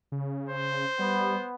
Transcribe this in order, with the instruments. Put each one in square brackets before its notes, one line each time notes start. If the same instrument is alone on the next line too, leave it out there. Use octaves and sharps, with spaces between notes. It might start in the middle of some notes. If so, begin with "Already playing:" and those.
[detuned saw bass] C#3
[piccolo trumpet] C5
[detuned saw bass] G3 [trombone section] B3